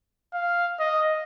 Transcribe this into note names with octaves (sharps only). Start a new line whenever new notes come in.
F5
D#5